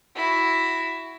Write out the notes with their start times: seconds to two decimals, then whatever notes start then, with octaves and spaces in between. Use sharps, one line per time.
0.16 E4 F#4